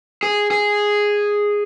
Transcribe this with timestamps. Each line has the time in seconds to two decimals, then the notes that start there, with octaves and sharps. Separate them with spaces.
0.23 G#4
0.51 G#4